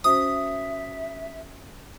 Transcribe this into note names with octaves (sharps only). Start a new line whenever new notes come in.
C#4 F#4 C5 E5 D#6